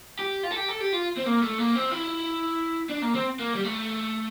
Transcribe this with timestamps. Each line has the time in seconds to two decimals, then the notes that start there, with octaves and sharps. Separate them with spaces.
0.19 G4
0.43 F4
0.51 A4
0.56 G4
0.68 A4
0.80 G4
0.93 F4
1.17 C4
1.26 A#3
1.42 A3
1.58 A#3
1.75 C4
1.91 E4
2.90 D4
3.02 A#3
3.15 C4
3.39 A#3
3.55 G3
3.64 A3